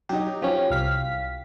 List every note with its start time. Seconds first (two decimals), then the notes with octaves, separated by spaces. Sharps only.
0.09 F#3 D#4 G4
0.42 F3 C#4 G4
0.70 C2 F5 B6